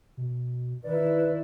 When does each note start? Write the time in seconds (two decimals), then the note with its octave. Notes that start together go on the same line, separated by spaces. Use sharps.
0.17 B2
0.84 D#3 E4 B4 D5